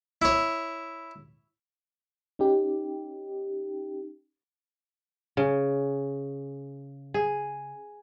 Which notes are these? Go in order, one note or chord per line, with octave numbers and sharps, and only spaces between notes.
E4 C#5
C#4 D#4 G4
C#3
G#4